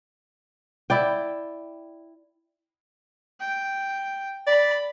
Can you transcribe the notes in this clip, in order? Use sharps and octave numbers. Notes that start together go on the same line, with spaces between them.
E4 D5 G5
G5
D5 B5